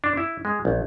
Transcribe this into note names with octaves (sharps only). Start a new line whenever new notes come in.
D4
E4
G#3
A#1